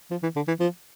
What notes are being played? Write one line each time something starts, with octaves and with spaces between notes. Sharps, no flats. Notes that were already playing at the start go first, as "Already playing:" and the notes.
F3
E3
D3
E3
F3